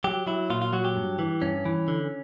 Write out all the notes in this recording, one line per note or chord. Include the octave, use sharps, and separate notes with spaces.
F#3 G4
F#3 E4
A#2 F4
F4
F#3 F#4
G4
G2
E3
G2 C#4
E3
D3